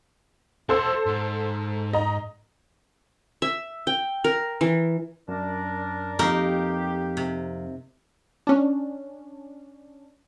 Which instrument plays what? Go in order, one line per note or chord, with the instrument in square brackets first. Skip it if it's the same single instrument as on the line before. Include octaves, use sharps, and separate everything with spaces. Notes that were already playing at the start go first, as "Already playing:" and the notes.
[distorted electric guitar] E4 F#4 [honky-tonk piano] A4 C5 E6
[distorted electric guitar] G#2
[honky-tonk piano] D#5 A#5
[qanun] E5
G5
A#4
E3
[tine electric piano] F#2 [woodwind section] D4 A#4 D5
[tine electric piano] F2 F5 [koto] A#3 D#4 A#4 [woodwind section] G4
[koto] C3
[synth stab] C#4 D4